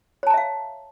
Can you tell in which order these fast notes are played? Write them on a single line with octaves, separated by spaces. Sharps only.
C#5 A5 A#5 E5 F5